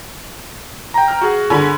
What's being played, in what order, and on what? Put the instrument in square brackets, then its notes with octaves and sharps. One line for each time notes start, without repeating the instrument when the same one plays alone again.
[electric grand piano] G5 A#5
[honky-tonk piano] F6
[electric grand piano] F#4 G#4
[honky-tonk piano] D3 G#5 B5